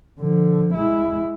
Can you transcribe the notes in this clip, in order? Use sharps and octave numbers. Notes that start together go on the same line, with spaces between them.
D3 F3
G#3 E4